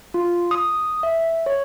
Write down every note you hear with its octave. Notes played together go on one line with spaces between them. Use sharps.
F4
D#6
E5
C#5